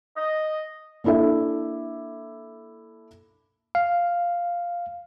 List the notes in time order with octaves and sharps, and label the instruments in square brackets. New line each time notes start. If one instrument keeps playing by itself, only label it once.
[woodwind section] D#5
[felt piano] A#3 D4 E4 A4 E5
[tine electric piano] F5